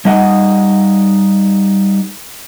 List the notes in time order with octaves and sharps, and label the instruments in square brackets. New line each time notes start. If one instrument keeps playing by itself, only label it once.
[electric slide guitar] G3 D#4 D#5 F#5